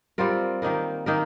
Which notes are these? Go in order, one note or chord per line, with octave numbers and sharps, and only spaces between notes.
G3 C4 F4 A#4
D#3 A#3 D#4 A#4
D#3 A#3 D#4 A#4